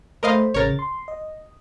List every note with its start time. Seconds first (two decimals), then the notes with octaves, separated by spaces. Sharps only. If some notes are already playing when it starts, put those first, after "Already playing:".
0.23 A3 A#4 C5 D#5 F5 B5
0.54 A1 C#3 A#4 C#5 A6
0.79 C6
1.08 D#5